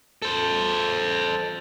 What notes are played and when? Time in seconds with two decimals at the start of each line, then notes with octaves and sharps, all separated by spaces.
0.22 A4 C5